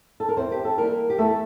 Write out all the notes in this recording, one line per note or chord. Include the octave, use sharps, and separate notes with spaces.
A4
A#4
E2 C4 C5
G4
A4
E3 G3 A#3 A#4
G4
E2 A3 A4